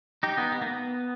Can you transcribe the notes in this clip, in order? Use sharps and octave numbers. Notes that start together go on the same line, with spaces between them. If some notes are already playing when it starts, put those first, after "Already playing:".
D#4 G4
B3 D#4
B3
A#3
B3